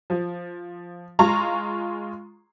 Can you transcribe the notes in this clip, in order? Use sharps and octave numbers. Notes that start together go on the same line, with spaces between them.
F3
G#3 F4 A#5 C#6